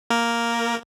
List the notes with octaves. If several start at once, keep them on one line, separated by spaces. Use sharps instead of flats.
A#3 A#4